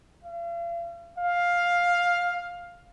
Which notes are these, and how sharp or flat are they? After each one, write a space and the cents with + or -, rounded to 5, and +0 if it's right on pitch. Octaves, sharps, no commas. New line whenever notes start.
F5 -40
F5 +10